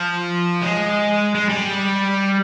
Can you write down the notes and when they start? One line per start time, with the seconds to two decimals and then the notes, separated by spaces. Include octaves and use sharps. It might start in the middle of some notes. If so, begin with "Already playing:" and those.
Already playing: F3
0.62 G#3
1.35 G#3
1.49 G3